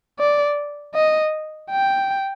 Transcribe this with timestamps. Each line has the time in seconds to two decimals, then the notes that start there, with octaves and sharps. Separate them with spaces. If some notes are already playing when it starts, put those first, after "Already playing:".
0.20 D5
0.95 D#5
1.71 G5